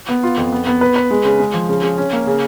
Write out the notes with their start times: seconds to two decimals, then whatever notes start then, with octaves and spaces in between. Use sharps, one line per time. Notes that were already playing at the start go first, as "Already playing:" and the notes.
0.09 B3
0.23 F4
0.37 F2
0.52 B3
0.67 B3
0.81 B4
0.96 B4
1.11 G#3
1.25 C#3
1.40 G#3
1.54 F3
1.69 C#3
1.83 C#3
1.98 C#4
2.13 A#3
2.27 C#3